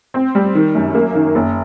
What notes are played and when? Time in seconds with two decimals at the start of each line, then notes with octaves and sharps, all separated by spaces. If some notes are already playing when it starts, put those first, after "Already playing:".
0.14 C4
0.35 G3
0.55 D#3
0.75 F#2
0.94 A#3
1.15 D#3
1.35 F#1